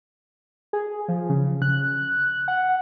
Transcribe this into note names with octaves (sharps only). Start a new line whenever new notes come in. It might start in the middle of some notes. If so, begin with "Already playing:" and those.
G#4
F3
C#3
F#6
F#5